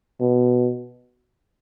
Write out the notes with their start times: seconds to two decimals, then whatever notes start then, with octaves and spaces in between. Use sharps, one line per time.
0.21 B2